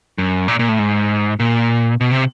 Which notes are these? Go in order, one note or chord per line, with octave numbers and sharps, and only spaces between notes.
F#2
A#2
A#2
A2
G#2
A#2
B2
C3